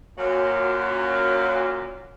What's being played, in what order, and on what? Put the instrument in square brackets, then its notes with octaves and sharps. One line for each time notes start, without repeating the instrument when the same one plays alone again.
[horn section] F#2 A#2 F#3